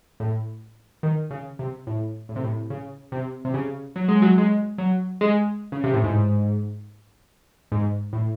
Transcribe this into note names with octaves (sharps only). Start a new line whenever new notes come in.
A2
D#3
C#3
C3
A2
A2
C3
A2
C#3
C3
C3
C#3
F#3
G#3
F#3
G#3
F#3
G#3
C#3
C3
A2
G#2
G#2
A2